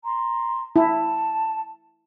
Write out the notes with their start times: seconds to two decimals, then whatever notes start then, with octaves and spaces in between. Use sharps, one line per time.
0.04 A#5 C6
0.76 E4 A5